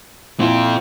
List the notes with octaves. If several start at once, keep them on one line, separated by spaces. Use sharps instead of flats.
A#2 C4 E4 F4